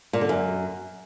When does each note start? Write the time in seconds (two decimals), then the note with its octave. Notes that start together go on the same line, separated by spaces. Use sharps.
0.13 A#2
0.21 D3
0.29 F#2